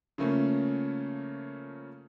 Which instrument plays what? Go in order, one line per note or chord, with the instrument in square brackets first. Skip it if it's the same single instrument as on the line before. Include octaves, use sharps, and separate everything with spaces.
[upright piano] C#3 F3 A3 A#3 C#4